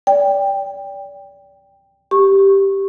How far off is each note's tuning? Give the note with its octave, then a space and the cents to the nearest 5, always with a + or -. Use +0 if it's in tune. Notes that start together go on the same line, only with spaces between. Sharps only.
D5 -30 G5 +10
G4 +0 C#6 -15